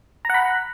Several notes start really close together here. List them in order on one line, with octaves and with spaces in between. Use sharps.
A#5 F#5 B5